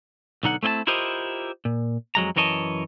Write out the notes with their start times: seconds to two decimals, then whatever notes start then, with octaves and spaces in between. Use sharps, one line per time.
0.43 B1 D3 D#4 F#5
0.63 A3 C4 E4 D#5 A5
0.87 E4 F4 G4 A#4 C5 D#5
1.65 A#2
2.15 F2 F#3 G#3 A#5
2.36 F#2 E3 A#4 C#5 D#5 A5